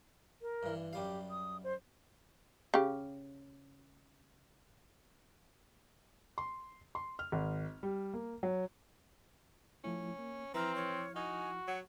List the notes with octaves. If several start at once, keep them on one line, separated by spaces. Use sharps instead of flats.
A#4
G2 E3
F#2 G3 G4 F5
D#6
C5
C#3 G4
C6
C6
F6
G#1
G3
A#3
F#3
F3 A3 C#4 E4
A#3
E3 F3 C4 E4 A#5 F6
C#5
D#4 F#4 G#5
F#3 F#5